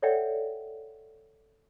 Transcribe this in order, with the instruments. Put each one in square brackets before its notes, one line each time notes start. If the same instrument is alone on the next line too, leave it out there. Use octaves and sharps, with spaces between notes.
[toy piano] A4 C#5 D5 E5 F#5 G5